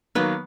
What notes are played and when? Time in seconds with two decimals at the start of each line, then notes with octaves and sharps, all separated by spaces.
0.15 D#3 F#3 A#3 B3 B4